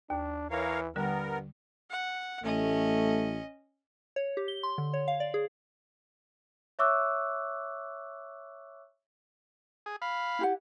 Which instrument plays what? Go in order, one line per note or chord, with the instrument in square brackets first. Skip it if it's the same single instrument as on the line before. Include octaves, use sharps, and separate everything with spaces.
[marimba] D#2 [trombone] D4
[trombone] E3 [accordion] A#4 C#5 F5
[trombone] G2 [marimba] D3 G3 [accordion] B3 A#4
[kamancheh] F#5
[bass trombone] A1 [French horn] A3 [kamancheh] C#4 D#5
[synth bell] C#5
G4
G7
C6
D3
C#5
F5
D5
G#4
[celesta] C#5 E5 C#6 D6 E6 F#6
[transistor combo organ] G#4
F5 B5
[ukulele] E4 G4 F#5